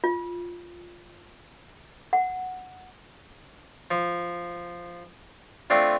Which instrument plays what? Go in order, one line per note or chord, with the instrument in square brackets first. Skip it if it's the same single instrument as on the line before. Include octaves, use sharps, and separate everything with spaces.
[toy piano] F4
F#5
[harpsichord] F3
A3 C4 D4 F4